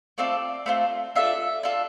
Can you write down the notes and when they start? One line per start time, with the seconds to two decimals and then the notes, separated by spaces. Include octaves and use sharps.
0.18 A3 C4 F4 A4 D5
0.66 A3 C4 F4 A4
1.15 D4 F4 A4 E5
1.63 D4 F4 A4